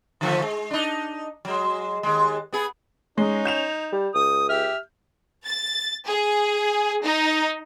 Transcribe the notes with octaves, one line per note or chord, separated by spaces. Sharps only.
D3 F3 A3
G#3
D4 D#4
F#3 G#3
D#2 G#3
B3 G#4
G#3 C#4 D#4
G6 E7 F7
G3
C#2 D#6
G4 E5 F6
A6
G#4
D#4